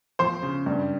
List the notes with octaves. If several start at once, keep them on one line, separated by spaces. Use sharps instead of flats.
F3 C5 C6
C#3
G2